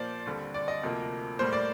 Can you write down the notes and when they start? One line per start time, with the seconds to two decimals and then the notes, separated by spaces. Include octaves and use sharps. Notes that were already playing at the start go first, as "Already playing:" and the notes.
Already playing: A#2 F3 A#3 C5 D5
0.26 D#2 D3 G3 C4
0.54 D5
0.68 D#5
0.83 D2 C3 F3 A#3
1.39 A2 G3 A#3 C5
1.53 D5